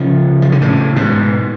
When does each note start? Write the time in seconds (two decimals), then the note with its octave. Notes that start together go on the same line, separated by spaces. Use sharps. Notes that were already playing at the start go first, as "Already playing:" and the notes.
Already playing: C#3 F3
0.42 F3
0.52 D3
0.61 A2 C#3
0.96 G#2 B2